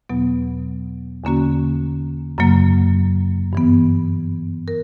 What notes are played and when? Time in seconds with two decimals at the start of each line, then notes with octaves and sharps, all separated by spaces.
0.09 E2 B2 F#3 B3
1.24 E2 D3 A#3 C#4 F#4
2.38 F#2 C#3 F#3 A#3
3.53 G2 E3 B3
4.68 A#4